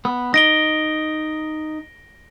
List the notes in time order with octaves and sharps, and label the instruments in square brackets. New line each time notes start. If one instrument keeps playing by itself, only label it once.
[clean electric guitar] B3
[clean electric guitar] D#4 [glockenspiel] A#6 D7 G7